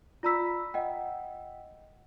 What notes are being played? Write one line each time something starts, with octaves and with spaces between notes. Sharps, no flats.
F4 D5 A#5 B5 E6 B6
D#5 F#5 G5